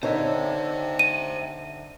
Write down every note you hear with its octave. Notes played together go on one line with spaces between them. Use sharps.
D3 D#4 C5 C#5 E5
D#7